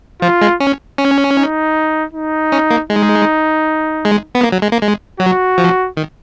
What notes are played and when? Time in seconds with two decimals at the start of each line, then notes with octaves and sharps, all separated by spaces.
0.22 F3 F4
0.42 G#3
0.60 C#4
0.98 C#4
1.36 D#4
2.13 D#4
2.52 C#4
2.71 A#3
2.90 G#3 D#4
4.05 G#3
4.35 B3
4.43 A#3
4.52 F#3
4.62 G#3
4.72 A#3
4.82 G#3
5.20 F#3 F#4
5.58 F3
5.97 D#3